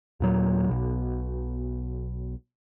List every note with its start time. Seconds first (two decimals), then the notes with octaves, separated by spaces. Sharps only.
0.20 D#2 A#2 F#3
0.68 B1 B2